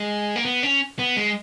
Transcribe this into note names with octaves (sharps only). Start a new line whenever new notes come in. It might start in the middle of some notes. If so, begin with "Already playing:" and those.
Already playing: G#3
A#3
B3
C#4
B3
G#3